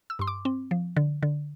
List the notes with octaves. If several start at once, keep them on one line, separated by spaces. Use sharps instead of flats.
E6
G2 C6
D6
C4
F3
D3
D3